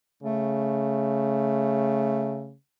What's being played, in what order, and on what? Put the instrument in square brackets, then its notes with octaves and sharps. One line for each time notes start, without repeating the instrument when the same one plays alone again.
[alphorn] C#3 [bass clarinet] A3